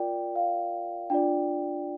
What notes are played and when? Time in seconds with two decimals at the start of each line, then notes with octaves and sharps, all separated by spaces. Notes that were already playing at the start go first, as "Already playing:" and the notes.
Already playing: F4 A#4 D5 G5
0.36 F5
1.10 D4 F4 D5 G5